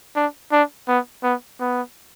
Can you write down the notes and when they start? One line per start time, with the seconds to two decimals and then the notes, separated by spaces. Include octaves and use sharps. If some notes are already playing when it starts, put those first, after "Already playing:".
0.16 D4
0.52 D4
0.88 B3
1.23 B3
1.60 B3